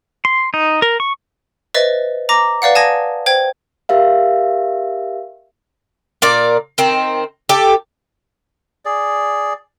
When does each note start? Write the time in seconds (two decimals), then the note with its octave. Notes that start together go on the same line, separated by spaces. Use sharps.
0.25 C6
0.54 D#4
0.82 A#4
1.00 C#6
1.74 B4 C5 D#5 E5 A6
2.29 A#5 D6 A#6
2.62 B4 D5 F5 F#5
2.75 G#5 A5 D#6 G#6 A#6
3.26 C5 G5 G#6
3.89 G4 A#4 E5 F5
6.22 A#2 A#4 D5
6.78 D#3 C4
7.49 G4 A4
8.85 G#4 D5